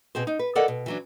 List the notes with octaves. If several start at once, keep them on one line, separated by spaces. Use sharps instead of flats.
B2 C4 G#4 C5
D#4
B4
A4 A#4 D5 D#5 F#5
B2
E3 F#3 D4